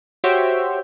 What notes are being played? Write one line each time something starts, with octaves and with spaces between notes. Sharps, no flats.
F#4 G4 C5 C#5 E5 G5